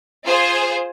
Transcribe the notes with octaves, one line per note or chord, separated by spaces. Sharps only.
F4 G#4 C5